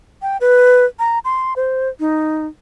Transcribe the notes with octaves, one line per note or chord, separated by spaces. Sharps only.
G5
B4
A#5
C6
C5
D#4